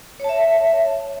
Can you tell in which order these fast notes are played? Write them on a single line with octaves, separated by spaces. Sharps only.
C#5 A5 E5